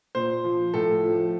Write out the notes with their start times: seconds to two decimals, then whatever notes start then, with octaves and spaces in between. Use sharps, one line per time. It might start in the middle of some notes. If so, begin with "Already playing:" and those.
0.15 A#2 C5
0.44 F3
0.74 A2 A4
1.04 F3